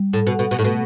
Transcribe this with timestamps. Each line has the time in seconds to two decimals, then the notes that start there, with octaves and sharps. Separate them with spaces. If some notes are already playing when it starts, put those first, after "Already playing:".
Already playing: G3
0.13 A2
0.27 B2
0.39 B2
0.51 B2
0.59 A2
0.64 B2 A3